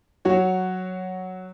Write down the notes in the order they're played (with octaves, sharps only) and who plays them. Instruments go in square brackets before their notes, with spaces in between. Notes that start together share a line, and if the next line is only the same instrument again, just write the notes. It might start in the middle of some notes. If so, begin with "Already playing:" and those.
[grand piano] F#3 F#4 C#5